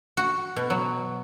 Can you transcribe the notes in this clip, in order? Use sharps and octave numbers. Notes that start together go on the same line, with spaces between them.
F#4
B2
F#3